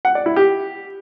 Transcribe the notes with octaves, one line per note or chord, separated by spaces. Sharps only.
F#5
D5
E4
G4